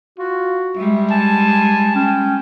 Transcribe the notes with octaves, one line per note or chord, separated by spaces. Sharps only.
F4 F#4
G3 G#3 E5
G#5 A5
C#4 G5